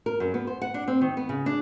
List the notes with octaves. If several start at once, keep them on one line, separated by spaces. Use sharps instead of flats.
A#4
F#2
B3
C5
F#5
D4
C4
D#3
B3
C#3
D4